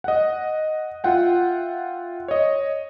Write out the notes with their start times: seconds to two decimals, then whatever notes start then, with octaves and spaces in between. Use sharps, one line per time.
0.04 D#5 F#5
1.04 F4 E5 F#5 G5
2.28 C#5 D#5